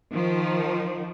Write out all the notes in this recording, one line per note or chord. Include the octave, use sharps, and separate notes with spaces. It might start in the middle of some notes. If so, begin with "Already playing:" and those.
D#3 F3